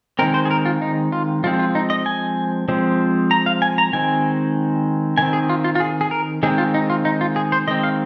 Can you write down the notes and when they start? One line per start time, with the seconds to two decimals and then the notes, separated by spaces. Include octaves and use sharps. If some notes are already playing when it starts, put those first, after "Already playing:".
0.19 D#3 G#3 C4 A#4
0.34 C5
0.45 G#4
0.51 A#4
0.66 F4
0.82 D#4
1.12 F4
1.44 F3 G#3 C4 F4
1.59 F4
1.75 D#4
1.90 D#5
2.06 G#5
2.68 F3 G#3 C4
3.31 A#5
3.46 F5
3.62 G#5
3.78 A#5
3.93 D#3 G#3 C4 G#5
5.18 D#3 C4 G#5
5.33 G#4
5.49 F4
5.64 F4
5.75 F4
5.80 G#4
6.01 G#4
6.11 A#4
6.43 D#3 G#3 C4 G#4
6.58 F4
6.74 D#4
6.90 F4
7.05 D#4
7.21 F4
7.36 G#4
7.52 C5
7.68 D#3 G#3 C4 D#5
7.83 F5